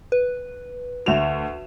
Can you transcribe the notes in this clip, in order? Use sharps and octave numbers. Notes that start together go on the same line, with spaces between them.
B4
D2 F#4 C#5 E5 E7 F7